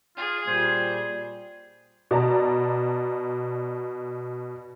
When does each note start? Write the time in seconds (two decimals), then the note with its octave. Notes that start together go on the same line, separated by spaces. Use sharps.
0.17 F4 G#4
0.47 A#2 G3 C5 G#6
2.11 B2 D5 A5 A#5